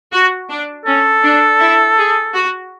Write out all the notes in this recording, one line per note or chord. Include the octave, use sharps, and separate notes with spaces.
F#4
D4
C#4 A4
D4
E4
G#4
F#4